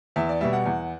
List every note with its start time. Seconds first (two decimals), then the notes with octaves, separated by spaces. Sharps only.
0.16 E2 E5
0.29 D5
0.41 B2 G3 E5
0.53 F#5
0.66 E2